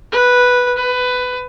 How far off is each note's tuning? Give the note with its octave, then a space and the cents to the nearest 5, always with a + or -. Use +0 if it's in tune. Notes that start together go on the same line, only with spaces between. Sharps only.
B4 -5
B4 +15